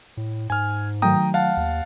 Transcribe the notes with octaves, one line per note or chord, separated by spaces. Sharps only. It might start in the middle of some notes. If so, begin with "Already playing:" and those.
A2
G#2 G#5 F6
D#3 F#3 A3 G5 A#5 D#6
F5 F#5 A5
D#2